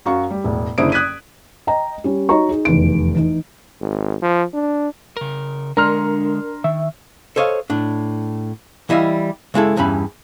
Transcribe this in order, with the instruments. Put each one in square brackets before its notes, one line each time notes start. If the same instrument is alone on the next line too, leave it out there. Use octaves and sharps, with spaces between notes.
[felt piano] F#2 F#4 F5 C#6
G3
E1 A2
F#1 D3 E4 C5 D#6 D7
D#6 F#6 G#6 B6 D#7
D#5 G5 A#5
G3 C#4
D#4 F#4 C#5 D#5 A#5 C#6
D#4 G#4
F1 E2 D#3 D7
E3 D#4
[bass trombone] G#1
F3
D4
[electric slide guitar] C#3 A#4
[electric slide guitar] D3 G#3 [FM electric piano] D4 [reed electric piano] A#4 [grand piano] A#5 C6 F6
[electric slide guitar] D#3 [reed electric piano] E5
[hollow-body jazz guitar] A4 C5 C#5 D#5 F5
A2 D4
E3 G3 E4 D#5 F5
C#3 G#3 E4 A4
E2 G2 E3 C#4 B5